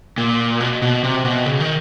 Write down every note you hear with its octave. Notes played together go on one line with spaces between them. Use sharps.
A#2
B2
B2
C3
B2
C#3
D#3